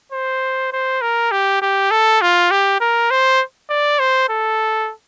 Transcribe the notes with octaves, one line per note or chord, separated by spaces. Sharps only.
C5
C5
A#4
G4
G4
A4
F4
G4
A#4
C5
D5
C5
A4